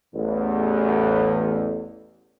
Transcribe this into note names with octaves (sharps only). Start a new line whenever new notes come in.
A1 E2